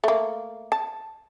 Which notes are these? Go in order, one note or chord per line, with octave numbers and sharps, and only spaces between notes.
A3 A#3
A5